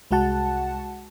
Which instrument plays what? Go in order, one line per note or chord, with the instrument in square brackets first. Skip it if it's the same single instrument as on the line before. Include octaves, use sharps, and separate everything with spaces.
[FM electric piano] C2 G#3 F#4 F#5 A5